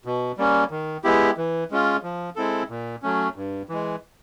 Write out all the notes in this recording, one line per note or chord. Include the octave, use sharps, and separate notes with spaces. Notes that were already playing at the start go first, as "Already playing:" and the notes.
B2
G3 A#3 C#4
D#3
G#3 B3 E4 G4
E3
G#3 C#4 F4
F3
G#3 C4 E4 A4
A#2
F#3 A3 C#4
G2
E3 G#3